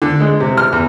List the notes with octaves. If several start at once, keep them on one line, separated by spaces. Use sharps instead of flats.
D3
G#3
C3
F6
E2